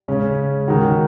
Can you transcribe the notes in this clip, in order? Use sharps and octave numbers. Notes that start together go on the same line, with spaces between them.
C#3 G#3 C#4
D#3 G#3 D#4 F#4